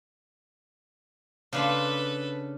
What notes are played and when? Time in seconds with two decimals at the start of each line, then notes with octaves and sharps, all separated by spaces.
1.53 C#3 D4 A4 B4 C6